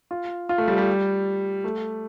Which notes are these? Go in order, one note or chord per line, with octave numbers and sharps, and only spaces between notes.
F4
F4
A3
G3
G3
A3